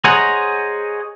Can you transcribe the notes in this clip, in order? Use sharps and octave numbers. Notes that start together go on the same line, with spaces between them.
G#4 C5 C#5 D#5 F#5 A#5